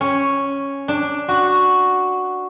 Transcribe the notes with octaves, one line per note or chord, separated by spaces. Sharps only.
C#4
D4
F#4